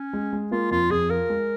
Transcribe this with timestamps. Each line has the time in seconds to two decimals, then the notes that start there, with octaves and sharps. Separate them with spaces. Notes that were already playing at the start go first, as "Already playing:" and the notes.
Already playing: C#4
0.13 G#3
0.33 G#3
0.51 A#3 F4
0.71 F2 F4
0.90 F2 G#4
1.09 F4 A#4
1.30 G#3